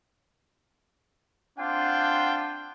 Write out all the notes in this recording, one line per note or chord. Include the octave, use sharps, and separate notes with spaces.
C4 D4 F4 F#5 G5 C6